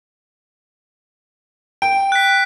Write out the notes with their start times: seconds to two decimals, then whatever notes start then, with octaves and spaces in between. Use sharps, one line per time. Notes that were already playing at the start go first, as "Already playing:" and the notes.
1.82 G5 D7
2.12 F#6 B6